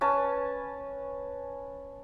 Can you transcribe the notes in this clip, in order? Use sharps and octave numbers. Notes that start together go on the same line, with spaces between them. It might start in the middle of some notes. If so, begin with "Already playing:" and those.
C#4 B4 A5